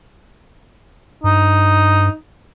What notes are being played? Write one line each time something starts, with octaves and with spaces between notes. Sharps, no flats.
G2 D#4